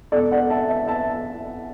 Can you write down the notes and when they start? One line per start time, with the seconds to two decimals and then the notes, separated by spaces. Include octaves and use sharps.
0.12 E1 E2 B2 A4 D5
0.31 D5 F#5
0.50 E5 A5
0.69 E5 A5
0.87 E5 A5